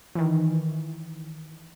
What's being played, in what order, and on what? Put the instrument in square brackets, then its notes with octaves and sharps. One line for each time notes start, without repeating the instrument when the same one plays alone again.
[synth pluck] D#3 E3